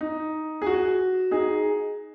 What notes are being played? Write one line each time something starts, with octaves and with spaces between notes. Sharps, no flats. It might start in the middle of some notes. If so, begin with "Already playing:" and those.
D#4
G#4
F#4
D#4 G#4